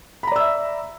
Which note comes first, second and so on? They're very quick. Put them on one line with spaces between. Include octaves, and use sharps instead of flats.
B5 A#5 D5 E6 E5